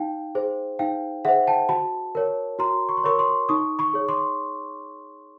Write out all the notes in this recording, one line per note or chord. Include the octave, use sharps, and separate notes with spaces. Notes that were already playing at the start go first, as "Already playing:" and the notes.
Already playing: D#4 F5 G5
G#4 C5
D#4 F5 G5
G#4 C5 E5 F#5
G5 A5
F#4 A5 B5
A#4 C#5
F#4 A#5 C6
C#6
C6
A#4 C#5 B5 C#6
C6 D6
D#4 C#6 D#6
B5 C#6
G#4 C#5
C6 D6